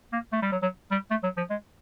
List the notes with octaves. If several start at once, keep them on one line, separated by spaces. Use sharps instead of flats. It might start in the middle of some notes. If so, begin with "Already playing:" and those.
A#3
A3
G3
F#3
F#3
G3
A3
F#3
F3
G#3